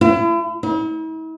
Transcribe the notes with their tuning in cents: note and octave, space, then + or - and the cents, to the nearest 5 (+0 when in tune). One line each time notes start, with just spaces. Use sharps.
E4 +40
E4 -45